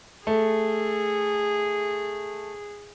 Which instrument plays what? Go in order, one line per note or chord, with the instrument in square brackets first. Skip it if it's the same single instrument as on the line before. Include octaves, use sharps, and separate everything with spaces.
[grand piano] A3 [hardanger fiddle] G#4